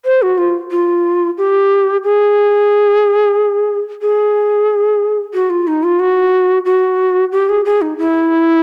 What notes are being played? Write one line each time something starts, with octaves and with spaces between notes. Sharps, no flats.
C5
F#4
F4
F4
G4
G#4
G#4
F#4
F4
D#4
F4
F#4
F#4
G4
G#4
G#4
D#4
E4